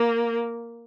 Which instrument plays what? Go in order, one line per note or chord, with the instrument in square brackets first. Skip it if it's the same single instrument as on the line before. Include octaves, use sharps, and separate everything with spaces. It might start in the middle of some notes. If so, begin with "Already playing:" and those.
Already playing: [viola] A#3